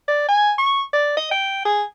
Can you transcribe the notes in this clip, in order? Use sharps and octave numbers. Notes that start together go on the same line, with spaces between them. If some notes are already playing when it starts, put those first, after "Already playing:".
D5
G#5
C#6
D5
D#5
G5
G#4